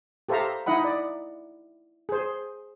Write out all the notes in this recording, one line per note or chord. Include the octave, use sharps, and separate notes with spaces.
G4 A4 C5 E5 F5 A#5
D#4 E4 D#5 F#5 B5
D5
G#4 C5